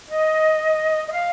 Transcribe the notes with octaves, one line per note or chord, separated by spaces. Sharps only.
D#5
D#5
F5